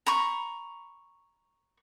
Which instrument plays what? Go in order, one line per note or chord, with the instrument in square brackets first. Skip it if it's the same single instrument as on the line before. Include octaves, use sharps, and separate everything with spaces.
[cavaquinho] A#5 B5 C#6